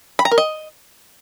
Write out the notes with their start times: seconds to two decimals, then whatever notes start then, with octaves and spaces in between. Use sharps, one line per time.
0.19 B5
0.25 A#5
0.31 A#4
0.38 D#5